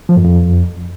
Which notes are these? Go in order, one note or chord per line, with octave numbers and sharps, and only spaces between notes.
F3
F#2
F2